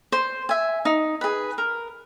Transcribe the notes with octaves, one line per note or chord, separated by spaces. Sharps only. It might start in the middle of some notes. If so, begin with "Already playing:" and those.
C5
E5 G#5
D#4
G#4 B4
A#4